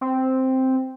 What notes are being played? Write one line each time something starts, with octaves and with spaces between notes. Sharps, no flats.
C4